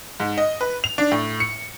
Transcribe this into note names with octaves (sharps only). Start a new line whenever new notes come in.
G#2
D#5
B4
F7
D4
A2
C#7